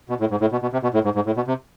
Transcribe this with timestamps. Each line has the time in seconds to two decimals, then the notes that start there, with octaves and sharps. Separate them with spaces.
0.09 B2
0.20 A2
0.31 G#2
0.41 A2
0.52 B2
0.62 B2
0.73 C3
0.83 B2
0.94 A2
1.05 G#2
1.15 G#2
1.26 A2
1.37 B2
1.47 C3